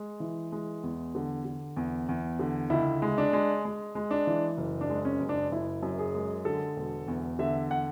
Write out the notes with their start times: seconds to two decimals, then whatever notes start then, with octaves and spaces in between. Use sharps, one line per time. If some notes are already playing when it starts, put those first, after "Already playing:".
Already playing: G#3
0.20 E3
0.52 G#3
0.83 E2
1.15 D3
1.45 D3
1.77 E2
2.09 E2
2.39 D3
2.70 C#2 E4
3.02 G#3
3.18 D4
3.33 G#3
3.65 G#3
3.95 G#3
4.11 D4
4.27 E3
4.58 F#1
4.81 D4
4.90 G#3
5.05 C#4
5.20 F#1
5.29 D4
5.51 F#1 E4
5.83 F#2
5.99 G#4
6.15 G#3
6.45 D3 A4
6.76 E1
7.08 E2
7.39 D3 E5
7.71 F#5